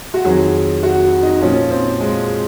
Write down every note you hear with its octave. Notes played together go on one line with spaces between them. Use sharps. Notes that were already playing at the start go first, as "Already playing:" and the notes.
F#4
F2 D#3 F#3 G#4
F#4
D#4
A#2 F3 C#4
C4
G#3